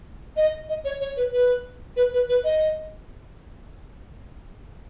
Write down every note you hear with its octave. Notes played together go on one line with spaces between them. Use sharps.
D#5
D#5
C#5
C#5
B4
B4
B4
B4
B4
D#5